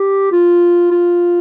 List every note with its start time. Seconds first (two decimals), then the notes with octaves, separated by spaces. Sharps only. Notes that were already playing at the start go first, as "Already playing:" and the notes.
Already playing: G4
0.32 F4
0.91 F4